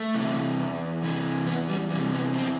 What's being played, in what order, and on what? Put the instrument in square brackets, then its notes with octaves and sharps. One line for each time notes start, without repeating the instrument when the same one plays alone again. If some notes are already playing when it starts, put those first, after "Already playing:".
Already playing: [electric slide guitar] A3
C3 E3
E2
C3 E3
E2 B3
G3
E3 G3
C3
B3
E2 C4